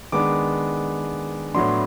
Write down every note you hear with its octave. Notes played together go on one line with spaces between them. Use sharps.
D#3 G#3 B3 D4 D6
A2 F#3 B3 D4 C6